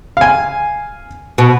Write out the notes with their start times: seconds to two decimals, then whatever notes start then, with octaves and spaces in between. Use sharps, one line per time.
0.17 F5 G#5
1.38 B2